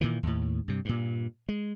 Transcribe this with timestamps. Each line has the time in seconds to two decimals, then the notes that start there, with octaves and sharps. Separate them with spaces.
0.01 A#2 D#3 E3
0.23 D#2 A2
0.68 G2 C3
0.85 G2 A#2
1.49 G#3